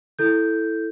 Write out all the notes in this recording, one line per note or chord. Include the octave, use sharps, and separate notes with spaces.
E4 A4 G6